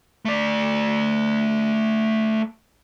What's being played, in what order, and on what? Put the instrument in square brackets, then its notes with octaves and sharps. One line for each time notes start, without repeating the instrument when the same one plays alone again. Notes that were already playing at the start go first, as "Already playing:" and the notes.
[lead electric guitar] A3 D5